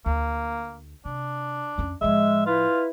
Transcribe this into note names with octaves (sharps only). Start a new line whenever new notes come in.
D2 A#3
C3 D4
F2 C#4
A2 F3 G#3 E5
E4 F4 B4